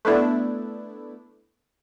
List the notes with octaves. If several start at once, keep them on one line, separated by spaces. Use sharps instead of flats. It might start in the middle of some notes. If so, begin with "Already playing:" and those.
A3 B3 D4 E4